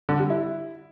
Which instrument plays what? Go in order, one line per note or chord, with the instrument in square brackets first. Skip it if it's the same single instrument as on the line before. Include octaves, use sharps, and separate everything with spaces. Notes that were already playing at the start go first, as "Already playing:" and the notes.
[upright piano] D3
G3
E4